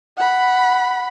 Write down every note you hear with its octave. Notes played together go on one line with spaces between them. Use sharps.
F#5 B5